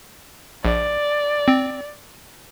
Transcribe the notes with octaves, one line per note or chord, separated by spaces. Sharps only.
A#1 D5
C4